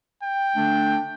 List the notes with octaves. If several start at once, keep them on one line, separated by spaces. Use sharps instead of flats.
G5
D3 A3 D4